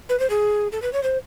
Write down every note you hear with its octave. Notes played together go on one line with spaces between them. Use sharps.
B4
C5
G#4
A4
B4
C#5
C5